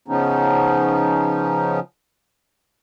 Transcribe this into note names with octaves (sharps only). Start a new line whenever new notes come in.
C#3 F3 B3 C#4 D#4